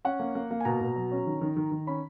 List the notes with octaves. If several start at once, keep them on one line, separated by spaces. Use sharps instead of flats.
C#4 F#5
A#3
A#3
A#3
G#5
B2 A#5
B2
F#3
C#4
D#3
D#3
D#3
D#3
C#4 B5